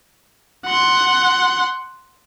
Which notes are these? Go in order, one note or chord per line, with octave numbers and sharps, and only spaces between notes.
F#5 C6